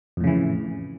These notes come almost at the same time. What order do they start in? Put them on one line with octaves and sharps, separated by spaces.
F2 A2 C#3 E3